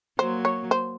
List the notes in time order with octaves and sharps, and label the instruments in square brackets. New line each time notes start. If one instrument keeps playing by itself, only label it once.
[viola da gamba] F#3 A#3 [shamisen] C5
[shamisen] C#5
C5